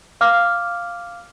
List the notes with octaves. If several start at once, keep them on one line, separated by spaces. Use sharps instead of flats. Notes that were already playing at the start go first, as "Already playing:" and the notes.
F5 D6 F6